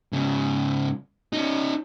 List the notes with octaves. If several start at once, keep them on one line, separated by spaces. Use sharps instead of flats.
G#2 C#3
C#4 D#4